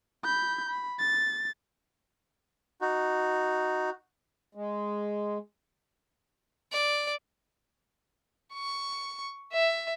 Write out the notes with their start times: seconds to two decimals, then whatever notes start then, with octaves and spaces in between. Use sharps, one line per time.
0.25 B5 G6
0.70 B5
0.99 A6
2.81 D#4 F#4
4.55 G#3
6.72 D5
8.54 C#6
9.53 E5